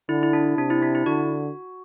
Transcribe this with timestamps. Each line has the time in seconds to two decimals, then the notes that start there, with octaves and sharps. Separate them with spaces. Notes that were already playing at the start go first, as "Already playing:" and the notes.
0.09 D3 E4
0.23 E4
0.33 D4
0.58 C3 D4
0.70 E4
0.83 D4
0.95 E4
1.06 D3 F#4